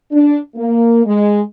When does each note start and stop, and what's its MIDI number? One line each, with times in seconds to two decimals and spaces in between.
0.11 0.39 62
0.56 1.04 58
1.05 1.40 56